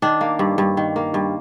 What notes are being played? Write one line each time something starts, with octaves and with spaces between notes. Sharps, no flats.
D#3 D4
A#3
G2
G2
D#3
A#3
G2